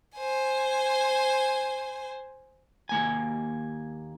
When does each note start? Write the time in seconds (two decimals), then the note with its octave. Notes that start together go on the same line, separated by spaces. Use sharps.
0.16 C5 G#5
2.89 D#2 A#3 G#5